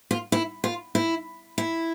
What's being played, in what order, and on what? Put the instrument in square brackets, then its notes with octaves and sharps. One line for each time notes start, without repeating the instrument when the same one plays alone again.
[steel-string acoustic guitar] F4
E4
F4
E4
E4